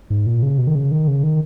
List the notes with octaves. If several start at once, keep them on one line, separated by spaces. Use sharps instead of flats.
G#2
A#2
C#3
B2
D#3
C#3
D#3
C#3
D#3